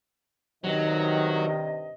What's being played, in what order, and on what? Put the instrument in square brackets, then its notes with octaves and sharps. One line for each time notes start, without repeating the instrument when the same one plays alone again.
[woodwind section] G2 C3 D#5 [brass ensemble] D#3 [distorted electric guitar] F#3